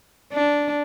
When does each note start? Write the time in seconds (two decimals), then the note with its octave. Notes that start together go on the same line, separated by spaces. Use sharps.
0.33 D4